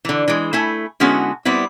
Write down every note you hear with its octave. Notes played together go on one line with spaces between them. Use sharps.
D3 E3
E3 G#3
A3 E4 G#5
D3 G#3 B3 C#4 E4 F#4
G3 B3 C4 E4